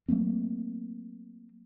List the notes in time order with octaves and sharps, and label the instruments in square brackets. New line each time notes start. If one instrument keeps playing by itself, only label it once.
[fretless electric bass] F#3 A3 A#3 C4